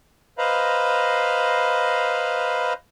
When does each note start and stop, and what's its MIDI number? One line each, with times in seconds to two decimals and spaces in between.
0.38 2.73 71
0.38 2.73 72
0.38 2.73 75
0.38 2.73 77
0.38 2.73 82
0.38 2.73 83